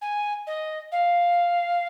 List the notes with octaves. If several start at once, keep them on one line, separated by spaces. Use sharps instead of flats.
G#5
D#5
F5